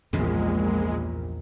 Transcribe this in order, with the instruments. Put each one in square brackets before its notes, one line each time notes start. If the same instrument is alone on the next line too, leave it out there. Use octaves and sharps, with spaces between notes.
[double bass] A#1 A#2 [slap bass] E2 G2 C#3 [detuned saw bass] G#3